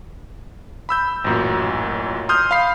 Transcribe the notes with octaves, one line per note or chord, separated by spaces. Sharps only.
B5 E6 G6
A1 F#2 A#2
C6 D#6 F6 G6
F5 B5 C7